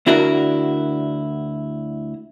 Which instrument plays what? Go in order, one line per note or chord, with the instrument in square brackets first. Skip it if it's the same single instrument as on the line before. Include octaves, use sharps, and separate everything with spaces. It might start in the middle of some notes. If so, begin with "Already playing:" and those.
[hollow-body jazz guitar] D2 D4 E4 F#4 A#4